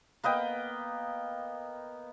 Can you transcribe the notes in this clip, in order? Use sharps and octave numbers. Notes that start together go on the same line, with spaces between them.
A#3 B3 D#5 G5